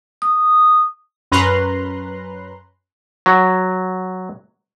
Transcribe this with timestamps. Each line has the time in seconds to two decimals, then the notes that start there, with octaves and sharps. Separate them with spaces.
0.22 D#6
1.32 F#2 C#4 B4 A#5 C6 F#6
3.26 F#3